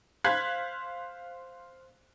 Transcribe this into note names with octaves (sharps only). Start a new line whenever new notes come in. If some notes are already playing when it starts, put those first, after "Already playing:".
C5 F5 F#6 G#6 B6